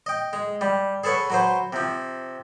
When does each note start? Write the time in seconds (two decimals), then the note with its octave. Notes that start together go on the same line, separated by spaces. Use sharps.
0.06 D#5 G5
0.33 G#3
0.61 G3
1.04 G#4 A4 B4 C#5 F#5
1.30 F#3 B4 C5
1.73 C3 F3